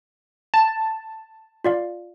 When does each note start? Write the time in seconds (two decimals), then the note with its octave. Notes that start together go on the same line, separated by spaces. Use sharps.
0.54 A5
1.64 F4 D5 F5